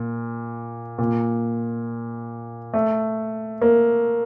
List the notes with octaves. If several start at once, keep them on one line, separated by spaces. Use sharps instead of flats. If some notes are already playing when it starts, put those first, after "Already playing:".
Already playing: A#2
A#2
A3
A#3